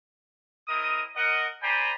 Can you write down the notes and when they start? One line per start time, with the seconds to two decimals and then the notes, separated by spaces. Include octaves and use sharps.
0.68 C4 E4 A#4 D#5 D#6
1.16 A#4 D#5 F#5
1.62 C5 D5 G5 G#5 A#5 B5